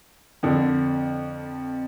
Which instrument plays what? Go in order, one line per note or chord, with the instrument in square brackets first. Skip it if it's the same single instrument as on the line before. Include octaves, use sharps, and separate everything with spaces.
[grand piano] F2 D3